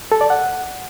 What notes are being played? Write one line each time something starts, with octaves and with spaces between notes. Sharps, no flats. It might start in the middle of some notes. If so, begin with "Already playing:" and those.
A4
D5
F#5